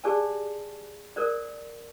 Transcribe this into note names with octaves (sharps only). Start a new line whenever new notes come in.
G4 G#4 C5 D5 G#5 A5
A4 A#4 C5 D5